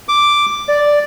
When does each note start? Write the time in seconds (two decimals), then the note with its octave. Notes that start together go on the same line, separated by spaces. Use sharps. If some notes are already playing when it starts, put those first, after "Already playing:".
0.08 D6
0.68 D5